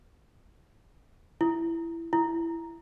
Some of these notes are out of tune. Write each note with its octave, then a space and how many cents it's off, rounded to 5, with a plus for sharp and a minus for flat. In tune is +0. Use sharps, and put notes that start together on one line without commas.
E4 +15
E4 +15